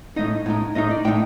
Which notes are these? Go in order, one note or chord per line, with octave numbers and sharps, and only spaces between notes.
A2 A3 D#4 D#5
A2 A3 D#4
A2 A3 D#4 D#5
D5
A2 A3 D#4 G5